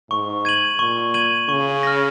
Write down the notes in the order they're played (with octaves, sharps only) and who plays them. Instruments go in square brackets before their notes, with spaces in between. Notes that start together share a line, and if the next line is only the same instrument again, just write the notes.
[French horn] G#2 [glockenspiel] C#6
[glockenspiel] G#6 D#7 F#7
[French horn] A#2 [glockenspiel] C#6
[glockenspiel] G#6 D#7 F#7
[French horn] C#3 [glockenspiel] C#6
[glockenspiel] F6 A#6